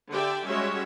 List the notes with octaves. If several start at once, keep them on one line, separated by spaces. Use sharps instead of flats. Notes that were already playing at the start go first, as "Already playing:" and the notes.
D3 G4 D5 E5 G5
G3 G#3 C#4 F#4 C#5 E5